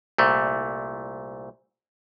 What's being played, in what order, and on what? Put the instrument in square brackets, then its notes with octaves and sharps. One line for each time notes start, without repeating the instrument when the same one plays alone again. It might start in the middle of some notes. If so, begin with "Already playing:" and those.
[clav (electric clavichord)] C2 A#2 A3